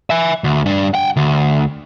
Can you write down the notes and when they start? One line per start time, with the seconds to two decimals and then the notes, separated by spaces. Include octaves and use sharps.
0.10 E5 G#5
0.44 D2
0.66 G2 D4
0.94 F#5 G5
1.17 D2